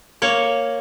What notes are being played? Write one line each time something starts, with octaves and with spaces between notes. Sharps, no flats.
A#3 C#5